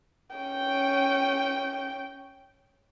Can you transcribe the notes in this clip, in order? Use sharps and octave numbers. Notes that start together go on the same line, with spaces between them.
C#4 G5